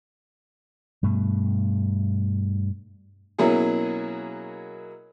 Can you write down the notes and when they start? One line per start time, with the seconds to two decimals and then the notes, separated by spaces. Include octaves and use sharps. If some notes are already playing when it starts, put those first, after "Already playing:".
1.03 G2 B2 A3
3.39 B2 F#3 A#3 C#4 E4 G#4